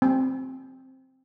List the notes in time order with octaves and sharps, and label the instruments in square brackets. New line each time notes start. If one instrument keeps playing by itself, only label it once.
[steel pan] C4